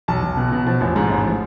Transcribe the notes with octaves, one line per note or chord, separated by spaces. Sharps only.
B1 A5
B1
B2
B2
F3 A5
A1
G#2
A1
F3